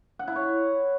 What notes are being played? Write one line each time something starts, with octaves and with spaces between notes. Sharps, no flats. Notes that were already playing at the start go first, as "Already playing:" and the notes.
F#5
E4
C#5